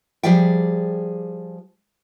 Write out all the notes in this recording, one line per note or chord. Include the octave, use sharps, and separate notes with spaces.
F3 G3 G#4 D5 E5 G5